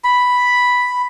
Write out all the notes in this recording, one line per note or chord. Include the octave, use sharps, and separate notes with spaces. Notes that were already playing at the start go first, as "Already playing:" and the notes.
B5